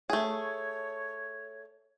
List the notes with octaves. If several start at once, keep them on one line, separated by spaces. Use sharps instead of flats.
A3 G#4 C#5